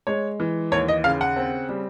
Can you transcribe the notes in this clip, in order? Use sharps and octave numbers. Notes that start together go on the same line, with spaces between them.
G#3 C#5
E3
D#2 C#5
D#5
C#3 F5
F#5
C4
G3